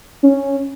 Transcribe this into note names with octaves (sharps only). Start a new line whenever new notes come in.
C#4